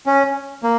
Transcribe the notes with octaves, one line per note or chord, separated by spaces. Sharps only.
C#4
A#3